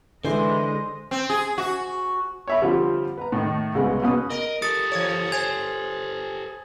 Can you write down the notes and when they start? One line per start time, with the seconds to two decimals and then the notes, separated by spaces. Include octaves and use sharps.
0.25 D3 E3 G#3 C5 D#5
1.11 C4
1.30 G#4
1.58 F#4
2.48 C#5 E5 B5
2.61 D3 F3 G3 C4 F4
3.18 B4 A#5
3.32 A2 D#3
3.75 C2 C#3 G#3 B3
4.02 B2 A#3 B3 C#4 B4 D#6
4.30 A#4 D#5
4.62 G4 A4 D#6 A6 C#7
4.91 E3 C#5
5.32 C5 G#5 G#6 F7